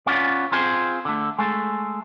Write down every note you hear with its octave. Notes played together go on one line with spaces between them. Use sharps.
B3 C#4 F4 D5
C4 F4 G#4 C5
D3 A3
G#3 A3